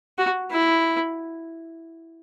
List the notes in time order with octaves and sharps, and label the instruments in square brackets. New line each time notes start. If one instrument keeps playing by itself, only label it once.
[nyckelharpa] F#4
E4